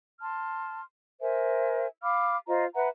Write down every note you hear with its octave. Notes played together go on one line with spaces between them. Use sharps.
A5 C6 F6
A#4 C5 E5 G#5
F5 B5 D6 F6
F4 C5 D#5 A#5
B4 E5 F#5 A#5